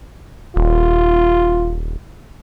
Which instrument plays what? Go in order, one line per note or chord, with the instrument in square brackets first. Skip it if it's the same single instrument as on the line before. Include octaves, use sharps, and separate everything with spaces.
[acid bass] D#1 [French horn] F4